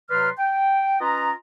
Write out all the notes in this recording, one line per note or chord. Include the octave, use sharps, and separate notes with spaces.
C3 F#3 B4 D5 C6 F6
G5
C#4 F4 B4 D#5 A#5